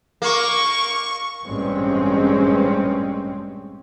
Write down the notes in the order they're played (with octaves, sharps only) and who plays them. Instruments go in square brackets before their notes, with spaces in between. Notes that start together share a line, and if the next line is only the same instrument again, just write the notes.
[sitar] A#3 [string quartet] C#6
[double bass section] A1 G2 A#2 G#3 C4 C#4